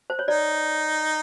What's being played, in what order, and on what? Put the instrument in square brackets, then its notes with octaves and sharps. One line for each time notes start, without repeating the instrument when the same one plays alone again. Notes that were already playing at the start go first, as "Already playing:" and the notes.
[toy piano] C5
C#5
[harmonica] D#4 [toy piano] D5